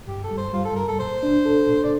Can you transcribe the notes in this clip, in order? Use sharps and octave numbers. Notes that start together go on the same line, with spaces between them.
G2 G4
A4
G3
C5
G3 F4
A4
G2 A#4
A4
A#2 C5
D4
A4
A#2
D5